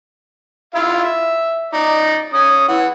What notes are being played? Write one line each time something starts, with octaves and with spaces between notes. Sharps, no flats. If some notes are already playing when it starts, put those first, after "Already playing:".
E4 F4 F5
E5
D#4 D5
C#4 D#6
E3 F#5